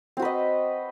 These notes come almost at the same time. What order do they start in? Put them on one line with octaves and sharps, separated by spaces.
C4 F#4 B4 D#5